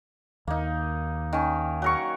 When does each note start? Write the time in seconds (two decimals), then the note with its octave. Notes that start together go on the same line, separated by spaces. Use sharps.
0.48 D#2 A#3 D#4
1.33 D#3 C#4
1.82 F#3 A#4 C#6